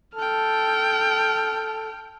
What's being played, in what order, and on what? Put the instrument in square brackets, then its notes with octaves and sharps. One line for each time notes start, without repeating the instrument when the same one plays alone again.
[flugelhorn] A4 [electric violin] G5 F6